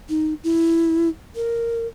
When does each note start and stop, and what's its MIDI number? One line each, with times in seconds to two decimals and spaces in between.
0.09 0.34 63
0.44 1.09 64
1.36 1.87 70